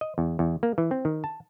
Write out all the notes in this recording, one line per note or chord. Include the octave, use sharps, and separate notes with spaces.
D#5
E2
E2
A#3
E3
C4
D#3
A5